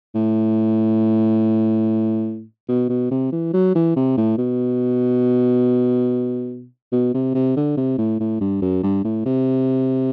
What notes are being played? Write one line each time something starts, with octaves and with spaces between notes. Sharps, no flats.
A2
B2
B2
C3
E3
F#3
E3
C3
A2
B2
B2
C3
C3
D3
C3
A2
A2
G2
F#2
G2
A2
C3